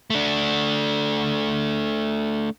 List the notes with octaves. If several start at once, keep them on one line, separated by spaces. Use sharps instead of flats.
A3 D4